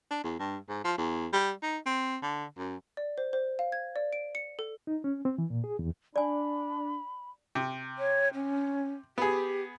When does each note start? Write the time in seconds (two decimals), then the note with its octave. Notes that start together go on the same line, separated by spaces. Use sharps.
0.10 D4
0.23 E2
0.39 G2
0.69 G#2
0.84 F3
0.98 E2
1.33 G3
1.62 D#4
1.86 C4
2.22 D3
2.58 F#2
2.97 D5
3.18 C5
3.33 C5
3.59 F5
3.72 G#6
3.96 D5
4.13 D7
4.35 C#7
4.59 A4
4.87 D#4
5.04 C#4
5.25 C4
5.38 E3
5.50 A#2
5.64 G#4
5.79 E2
6.16 D4 D5 G#5 B5
7.55 C3
7.98 C#5
8.34 C#4
9.18 B3 G4 G#4